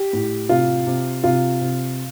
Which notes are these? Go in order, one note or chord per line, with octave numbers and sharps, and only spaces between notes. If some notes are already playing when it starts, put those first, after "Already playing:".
Already playing: G4
A2
C3 F4
C3
C3 F4
C3